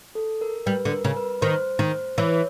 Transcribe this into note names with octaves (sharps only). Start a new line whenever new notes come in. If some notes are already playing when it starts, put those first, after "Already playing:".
A4
A#4
G3 B4
D3
A#4
C#3
B4
D#3 C5
D#3
E3 C#5